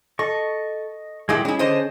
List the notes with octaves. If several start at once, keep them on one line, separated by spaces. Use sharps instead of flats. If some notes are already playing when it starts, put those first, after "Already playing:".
A4 D#5 C#6
A#2 G3 G#3 E4 G#4
G#3 C#4 E4 G#4
D3 C5 D#5